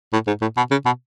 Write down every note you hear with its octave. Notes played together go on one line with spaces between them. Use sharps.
A2
G#2
A2
B2
C#3
B2